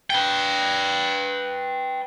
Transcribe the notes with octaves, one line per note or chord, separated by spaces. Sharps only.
B4 G5